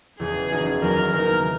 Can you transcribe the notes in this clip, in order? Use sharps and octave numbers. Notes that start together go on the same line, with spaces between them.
E1 E2 C#3 G#4
F#1 F#2 E3 B3 D#4
E2 D#3 F#3 A#4
C#3 F#3 A#3 D#4 A#4